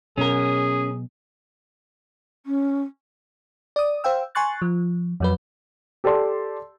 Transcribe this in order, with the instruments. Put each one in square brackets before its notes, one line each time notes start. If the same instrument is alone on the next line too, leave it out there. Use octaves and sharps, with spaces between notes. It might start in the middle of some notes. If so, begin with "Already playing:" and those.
[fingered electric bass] B2 F#3 [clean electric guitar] C#4 A#4 [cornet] G#4
[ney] C#4
[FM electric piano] D5 D#6
C5 F5 G5 E6
G#5 C6 C#6 F#6 A6
F3
F2 F#3 B4
[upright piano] G4 A4 D5 A5 C6